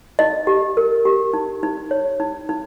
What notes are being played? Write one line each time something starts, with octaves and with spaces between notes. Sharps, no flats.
D#4 D#5
G4
A#4
G4
D#4
D#4
C#5
D#4
D#4